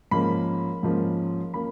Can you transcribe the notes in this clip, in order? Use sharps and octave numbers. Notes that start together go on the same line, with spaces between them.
G#2 F3 A#3 C#4 B5
G#2 F3 A#3 C#4
F3 A#3 C#4 B5